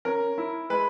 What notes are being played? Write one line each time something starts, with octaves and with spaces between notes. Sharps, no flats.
C#4 A#4
E4
G#3 B4